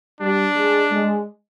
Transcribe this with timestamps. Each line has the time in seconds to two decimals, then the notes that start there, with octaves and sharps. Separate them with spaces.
0.20 G3 D4
0.55 G#3
0.91 G#3